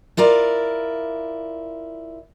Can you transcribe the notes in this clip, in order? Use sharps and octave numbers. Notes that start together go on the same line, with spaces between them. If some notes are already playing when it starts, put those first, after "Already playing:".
E4 F4 A#4 D5